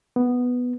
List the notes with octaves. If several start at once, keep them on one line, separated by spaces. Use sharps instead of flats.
B3